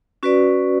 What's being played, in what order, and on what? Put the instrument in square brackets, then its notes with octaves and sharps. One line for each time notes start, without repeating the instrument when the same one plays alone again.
[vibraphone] C#4 F#4 B4 D5